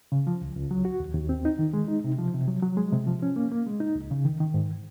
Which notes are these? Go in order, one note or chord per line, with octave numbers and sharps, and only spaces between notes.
C#3
F3
C#2
C#2
F#3
F#4
D#2
D#2
C4
D#4
D#3
G#3
D#4
C3
F3
C3
F#3
F#3
G#3
C3
F3
C#4
A#3
A#3
G#3
D#4
C#2
C#3
D#3
D#3
G#2